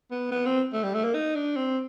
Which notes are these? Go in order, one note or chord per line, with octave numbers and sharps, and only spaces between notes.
B3
B3
C4
A3
G3
A3
A#3
D#4
D4
C4